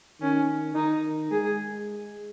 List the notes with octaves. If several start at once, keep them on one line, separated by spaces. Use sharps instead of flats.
D#3 C#4
D#3 D#4
G#3 G#4